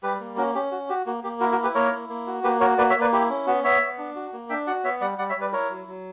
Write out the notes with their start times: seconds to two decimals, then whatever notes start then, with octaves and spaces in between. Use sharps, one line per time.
0.03 G3 G4 B4
0.20 A#3
0.37 C#4 F#4 A#4
0.55 C#4 G4
0.71 F#4
0.89 F#4 G4
1.06 A#3 F#4
1.23 A#3 G4
1.40 E4 F#4 A#4
1.52 F#4 A#4
1.58 E4
1.63 G4 B4
1.75 A#3 A#4 C#5
1.92 E4
2.09 A#3
2.27 F#4
2.44 A#3 G4 B4
2.60 F#4 A#4 C#5
2.78 A#3 B4 D5
2.90 C#5 E5
2.95 A#3
3.01 B4 D5
3.12 E4 G4
3.30 C#4
3.47 B3 F#4
3.64 B3 C#5 E5
3.81 B3
3.98 D4
4.16 F#4
4.33 A#3
4.49 D4 E5 G5
4.67 F#4 D5 F#5
4.84 B3 C#5 E5
5.01 G3 D5 F#5
5.18 G3 D5 F#5
5.29 C#5 E5
5.36 G3
5.41 B4 D5
5.52 E4 A#4 C#5
5.70 F#3
5.87 F#3